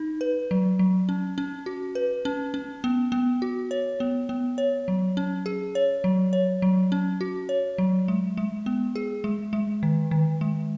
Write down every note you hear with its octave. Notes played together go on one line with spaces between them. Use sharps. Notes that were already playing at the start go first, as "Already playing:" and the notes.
Already playing: D#4
B4
F#3
F#3
C#4
C#4
F#4
B4
C#4
C#4
B3
B3
F#4
C#5
B3
B3
C#5
F#3
C#4
G#4
C#5
F#3
C#5
F#3
C#4
F#4
C#5
F#3
G#3
G#3
B3
G#4
G#3
G#3
D#3
D#3
G#3